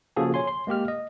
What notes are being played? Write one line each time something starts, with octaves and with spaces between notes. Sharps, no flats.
C#3 F3 A#3 F#4 G#4 A4
C#5 G#5 C6
C6
G#3 A#3 G4 F6
D#5